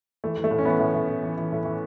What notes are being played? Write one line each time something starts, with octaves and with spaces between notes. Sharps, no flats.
E3 A3
E3
A3
A2
C#4
E3 B3
A2
A2
A2
E3
E3
A2
E3